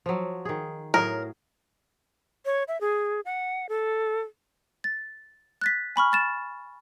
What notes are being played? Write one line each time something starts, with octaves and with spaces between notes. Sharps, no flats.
F3 F#3
D#3 G#4
A2 F#3 G#4 A#4
C#5
E5
G#4
F#5
A4
A6
F#6 A6 B6
G#5 B5 C#6 F6
F6 A6 E7